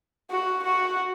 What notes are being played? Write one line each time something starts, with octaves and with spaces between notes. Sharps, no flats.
F#4
F#4